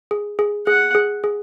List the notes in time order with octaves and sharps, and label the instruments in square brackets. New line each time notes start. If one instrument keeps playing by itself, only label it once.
[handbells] G#4
G#4
[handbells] G#4 [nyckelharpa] F#5
[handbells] G#4
G#4